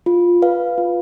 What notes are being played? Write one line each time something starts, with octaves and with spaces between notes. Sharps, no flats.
F4
B4 F5
F4